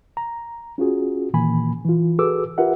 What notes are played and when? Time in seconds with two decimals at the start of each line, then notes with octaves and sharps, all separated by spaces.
0.17 A#5
0.78 C#4 F4 F#4 G#4
1.34 A#2 D#3 E3 A#3 G#5 B5
1.85 E3 F4
2.19 F#4 G#4 A4 B4 D6 E6
2.58 F4 G4 A#4 B4 E5 F#5